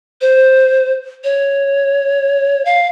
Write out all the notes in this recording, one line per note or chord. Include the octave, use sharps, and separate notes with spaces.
C5
C#5
F5